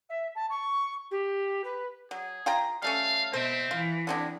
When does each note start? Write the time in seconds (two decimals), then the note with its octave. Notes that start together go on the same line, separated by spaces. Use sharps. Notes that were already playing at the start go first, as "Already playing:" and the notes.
0.09 E5
0.35 A5
0.50 C#6
1.10 G4
1.63 B4
2.11 F#3 G#4
2.46 F4 G5 A#5
2.82 G3 A3 C#4 F5
3.33 B2 C4 C5 E5
3.71 E3 F4
4.07 D3 G#3 C4 D4